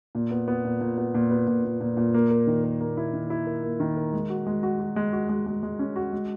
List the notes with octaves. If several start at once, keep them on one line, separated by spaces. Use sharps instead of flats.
A#2
B3
B3
A#2
A#2
B3
A#2
B3
A#2
A#2
A#2
A#2
A#3
A#4
D#3
A#4
A#3
E4
D#3
E4
A#4
A#3
D#3
A#4
G#3
F#4
G#3
F#4
F#4
G#3
F#4
G#3
G#3
G#3
C#4
F#4
G#3